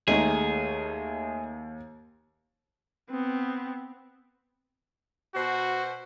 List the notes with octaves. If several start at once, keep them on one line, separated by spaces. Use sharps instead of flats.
D#2 G#3 A3 D#4 G#4
B3 C4
B2 F#4 C5